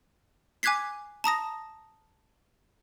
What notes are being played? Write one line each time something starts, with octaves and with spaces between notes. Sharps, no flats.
G#5 D6 F#6 G#6 B6 C7
A5 A#5 D#6 A#6